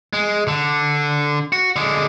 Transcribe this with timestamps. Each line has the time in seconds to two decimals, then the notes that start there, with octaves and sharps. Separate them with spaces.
0.13 G#3
0.48 D3
1.52 F#4
1.76 D3 G#3